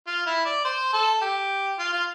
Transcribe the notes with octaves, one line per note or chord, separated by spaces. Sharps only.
F4
E4
D5
C5
A4
G4
F4
F4